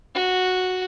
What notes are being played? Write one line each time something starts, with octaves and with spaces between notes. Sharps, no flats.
F#4